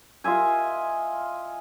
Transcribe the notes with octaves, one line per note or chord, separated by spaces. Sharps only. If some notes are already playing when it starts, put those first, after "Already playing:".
F4 D#5 E5 G#5